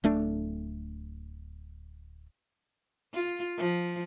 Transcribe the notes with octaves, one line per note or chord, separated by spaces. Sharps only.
D1 A3 D4
F4
F3